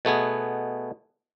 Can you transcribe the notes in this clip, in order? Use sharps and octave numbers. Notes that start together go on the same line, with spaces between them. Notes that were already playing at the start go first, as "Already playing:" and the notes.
B2 A3 B3 G#4